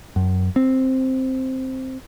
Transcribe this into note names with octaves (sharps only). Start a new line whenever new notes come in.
F#2
C4